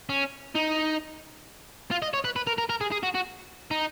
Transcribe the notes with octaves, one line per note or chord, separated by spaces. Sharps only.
C#4
D#4
F4
D#5
C#5
B4
B4
A#4
A#4
A#4
G#4
G#4
F#4
F#4
D#4